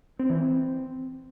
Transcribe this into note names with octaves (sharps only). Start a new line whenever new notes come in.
C4
E3
C4